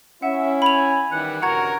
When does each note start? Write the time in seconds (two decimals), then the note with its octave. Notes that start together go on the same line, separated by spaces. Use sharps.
0.22 C#4 E4 E5 F#5
0.62 G#5 B5 F7
1.11 D#3 E3 G3 F#5
1.42 G2 C#3 F#4 A#4 F#5 A#5 G#6